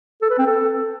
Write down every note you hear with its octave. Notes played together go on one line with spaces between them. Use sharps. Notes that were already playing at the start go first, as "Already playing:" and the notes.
A4
B4
C4
A4